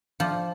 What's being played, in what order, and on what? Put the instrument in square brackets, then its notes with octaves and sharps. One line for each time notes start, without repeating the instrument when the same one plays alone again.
[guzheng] F3